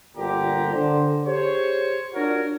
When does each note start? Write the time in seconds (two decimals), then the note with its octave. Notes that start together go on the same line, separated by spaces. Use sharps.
0.17 G1 A#2 D3 G4 A#5
0.73 D3 C5
1.25 G4 G#4 C5 C#5
2.14 D4 F4 F#4 A#4 C#5